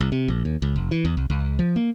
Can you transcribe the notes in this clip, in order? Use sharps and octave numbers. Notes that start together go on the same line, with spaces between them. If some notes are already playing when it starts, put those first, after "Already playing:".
C2
C3
A#1
D#2
C#2
F1
E3
E2
C2
C#2
F3
A#3